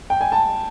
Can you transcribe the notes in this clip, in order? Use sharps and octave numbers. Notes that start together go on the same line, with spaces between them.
G5
G#5
A5